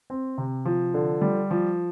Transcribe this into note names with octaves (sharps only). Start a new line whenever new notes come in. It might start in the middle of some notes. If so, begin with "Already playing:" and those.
C4
C3
F3
D3
G3
F3